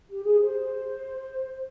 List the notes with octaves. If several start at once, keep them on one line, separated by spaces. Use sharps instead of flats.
G4
G#4
C5